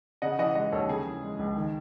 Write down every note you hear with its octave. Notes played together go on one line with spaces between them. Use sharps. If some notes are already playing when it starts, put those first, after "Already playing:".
C#3 D#5 F#5
E3 D#5 F#5
G#3 D#5 F#5
D#2 A4 C#5
C#3 G#4
E3
G#3
C#2
D#3